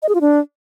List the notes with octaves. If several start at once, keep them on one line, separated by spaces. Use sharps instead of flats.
D#5
G#4
F4
D4